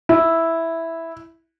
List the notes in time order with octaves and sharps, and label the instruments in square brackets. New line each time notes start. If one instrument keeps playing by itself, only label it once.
[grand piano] E4